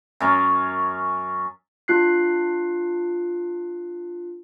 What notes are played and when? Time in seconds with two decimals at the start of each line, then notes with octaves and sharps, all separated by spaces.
0.20 F#2 C#4
1.88 D4 F4 F#6 C7